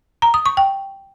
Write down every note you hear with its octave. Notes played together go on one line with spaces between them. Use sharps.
A#5
D#6
C#6
G5